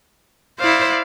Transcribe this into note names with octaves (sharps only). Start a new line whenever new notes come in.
E4 C5 D5 F5